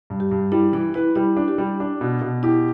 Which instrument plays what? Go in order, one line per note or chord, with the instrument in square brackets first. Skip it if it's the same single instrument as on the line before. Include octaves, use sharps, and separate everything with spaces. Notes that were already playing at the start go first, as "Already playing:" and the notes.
[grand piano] G2
[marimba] G4
[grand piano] G2
[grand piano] G3 [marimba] E4
[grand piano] E3 [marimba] E4
[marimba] E4 [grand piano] B4
[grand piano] G3 [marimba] E4
[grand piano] D4
[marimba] G4
[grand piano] G3
D4
B2
B2
[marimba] E4 [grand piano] G4